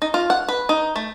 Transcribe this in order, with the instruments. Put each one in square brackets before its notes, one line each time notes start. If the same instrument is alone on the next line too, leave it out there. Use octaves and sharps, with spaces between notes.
[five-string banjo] D#4
F4
F#5
B4
D#4
A3